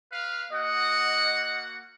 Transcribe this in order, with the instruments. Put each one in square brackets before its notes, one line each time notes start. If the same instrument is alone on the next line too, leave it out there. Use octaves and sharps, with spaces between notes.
[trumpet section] B4 F5
[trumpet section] A#3 F#4 F#5 [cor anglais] D#5